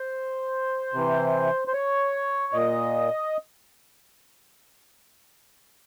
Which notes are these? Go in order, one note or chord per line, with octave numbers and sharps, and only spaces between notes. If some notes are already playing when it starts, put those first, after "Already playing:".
Already playing: C5
C3 E3
C5
C#5
A#2 D#5